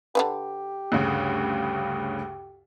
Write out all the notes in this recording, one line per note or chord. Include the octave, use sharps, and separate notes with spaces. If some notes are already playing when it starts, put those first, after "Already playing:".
D3 E3 G4 B4
D2 G2 C#3